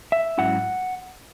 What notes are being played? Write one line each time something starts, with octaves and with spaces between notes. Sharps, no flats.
E5
G#2 F#3 C#4 E4 F#5